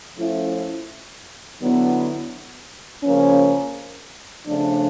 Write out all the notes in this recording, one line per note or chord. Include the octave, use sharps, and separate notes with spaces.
F3 A3 C#4 E4
D3 F#3 B3 E4
C#3 F3 A#3 C#4
C#3 F3 A3 D4